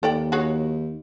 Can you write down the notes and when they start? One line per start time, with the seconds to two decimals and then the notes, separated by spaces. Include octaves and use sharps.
0.03 D#2 A4 D5 G5
0.32 F#4 G#4 C#5